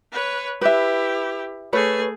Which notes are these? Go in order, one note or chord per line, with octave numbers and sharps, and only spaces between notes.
B4 C#5
E4 G4 B4 E5
A3 G#4 B4 C#5